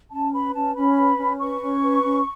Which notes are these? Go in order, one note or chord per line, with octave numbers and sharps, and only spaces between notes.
C#4 A5
B4 B5
C#4 A5
C#4 B5
B4
C#4
B4 C#6
C#4
B4
C#4